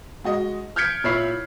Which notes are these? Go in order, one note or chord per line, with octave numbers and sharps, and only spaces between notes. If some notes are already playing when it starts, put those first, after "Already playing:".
G#3 F#4 D#5
F6 G6 G#6 B6 C#7 D7
A#2 E4 C#5 B5 C7